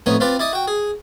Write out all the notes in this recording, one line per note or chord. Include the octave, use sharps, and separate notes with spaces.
F2 A2 B3 D#4 C#5
C4 F4 B4 D5
E4 D5 D#5
F#4 G5
G#4